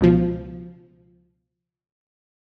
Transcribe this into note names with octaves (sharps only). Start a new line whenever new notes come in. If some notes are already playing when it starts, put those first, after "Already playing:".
C#2 B2 F3